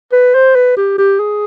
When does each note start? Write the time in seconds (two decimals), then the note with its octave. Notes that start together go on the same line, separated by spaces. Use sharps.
0.12 B4
0.34 C5
0.55 B4
0.77 G4
0.98 G4
1.19 G#4